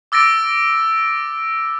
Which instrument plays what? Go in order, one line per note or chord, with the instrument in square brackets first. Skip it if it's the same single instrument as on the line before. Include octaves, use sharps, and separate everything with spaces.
[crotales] D6 E6 A6 A#6 D7